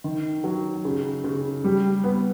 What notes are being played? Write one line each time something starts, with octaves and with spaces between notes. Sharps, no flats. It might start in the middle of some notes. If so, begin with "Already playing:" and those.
D#3
F#3
C#3
C#3
G3
B3